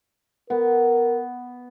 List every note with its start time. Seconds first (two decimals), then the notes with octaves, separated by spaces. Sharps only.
0.50 B3 A#4